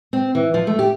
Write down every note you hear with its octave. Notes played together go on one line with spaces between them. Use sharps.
C4
E3
F3
A3
G4